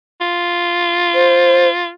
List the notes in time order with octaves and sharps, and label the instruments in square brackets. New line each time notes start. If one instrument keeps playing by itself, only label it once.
[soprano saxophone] F4
[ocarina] C5